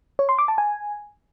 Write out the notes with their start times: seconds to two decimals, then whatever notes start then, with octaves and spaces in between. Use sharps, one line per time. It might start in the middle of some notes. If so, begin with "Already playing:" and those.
0.19 C#5
0.29 C6
0.39 D6
0.48 A5
0.58 G#5